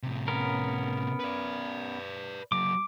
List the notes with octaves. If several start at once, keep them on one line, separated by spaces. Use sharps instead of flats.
A2 C3
B3 C#4 A#4
B4 D5
F#3 A#3 D6